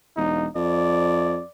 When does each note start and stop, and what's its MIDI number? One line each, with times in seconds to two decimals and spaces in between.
0.17 0.47 28
0.17 0.49 63
0.56 1.40 41
0.56 1.51 74